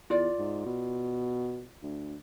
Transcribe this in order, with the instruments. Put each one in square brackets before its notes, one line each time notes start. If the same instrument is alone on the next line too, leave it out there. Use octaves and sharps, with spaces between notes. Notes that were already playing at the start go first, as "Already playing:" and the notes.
[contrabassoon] E2 [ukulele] F4 D5
[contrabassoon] G#2
B2
D2